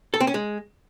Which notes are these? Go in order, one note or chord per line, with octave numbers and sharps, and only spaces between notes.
A4
C4
C#4
G#3